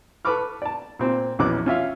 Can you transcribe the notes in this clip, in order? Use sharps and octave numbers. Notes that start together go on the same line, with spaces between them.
A4 B4 B5 C#6 D6 F6
D5 A5
A#2 C4 C5
A#1 E2 B2 C#4 D6 F#6
C#4 F4 E5 F5